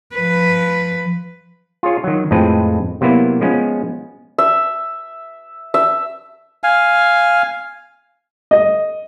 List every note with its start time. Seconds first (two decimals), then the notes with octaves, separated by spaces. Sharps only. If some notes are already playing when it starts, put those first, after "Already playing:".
0.15 F3 B4
1.83 F4 G#4 C#5
2.04 D#3 F#3
2.31 F2 A2 G#3 C4 B4
3.01 C3 F#3 A#3 B3 E4
3.41 F3 G#3 B3 C#4
4.38 E5
5.74 E5
6.64 F5 G#5
8.51 D#5